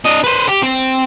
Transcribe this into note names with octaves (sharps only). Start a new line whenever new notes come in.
D4 D#5
B4 C5
G4
C4